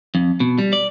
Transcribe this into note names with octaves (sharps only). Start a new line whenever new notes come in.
F2
B2
G3
D5